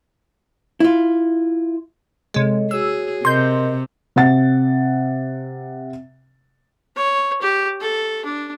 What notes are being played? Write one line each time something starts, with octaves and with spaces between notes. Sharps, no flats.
E4 F4
C3 G#3 A4 C#5 D#5
F#4 G#4 C#5 E6
C3 A#4 D#5 C6 G6
C3 F#5 A6
C#5
G4
A4
D4